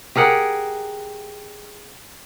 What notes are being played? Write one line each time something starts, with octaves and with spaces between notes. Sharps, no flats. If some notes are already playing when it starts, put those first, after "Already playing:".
G4 G#4 A#4 F#5